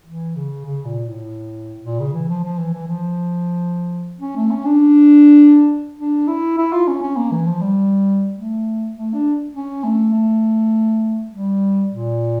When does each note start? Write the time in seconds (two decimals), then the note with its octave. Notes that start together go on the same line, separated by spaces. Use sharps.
0.06 E3
0.36 C#3
0.66 C#3
0.85 A#2
1.06 A2
1.84 A#2
2.00 C#3
2.14 E3
2.29 F3
2.44 F3
2.58 E3
2.74 E3
2.88 F3
4.21 C#4
4.37 A3
4.51 C#4
4.66 D4
5.99 D4
6.28 E4
6.58 E4
6.73 F4
6.88 C#4
7.02 C#4
7.17 A#3
7.32 E3
7.47 F3
7.62 G3
8.36 A3
8.95 A3
9.14 D4
9.54 C#4
9.84 A3
10.13 A3
11.31 G3
11.90 A#2